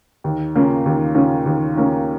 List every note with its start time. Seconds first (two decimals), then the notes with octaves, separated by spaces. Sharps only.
0.24 D#2
0.56 C#3 A#3 C#4 F4
0.86 D#2
1.15 C#3 A#3 C#4 F4
1.46 D#2
1.75 C#3 A#3 C#4 F4